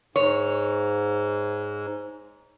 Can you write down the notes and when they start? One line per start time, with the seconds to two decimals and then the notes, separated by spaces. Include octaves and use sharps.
0.16 G#2 C#5